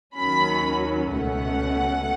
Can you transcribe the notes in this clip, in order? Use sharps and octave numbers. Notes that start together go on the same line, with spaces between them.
D#2 D#3 F#3 C#4 B5
C#2 B2 A3 C#4 F#5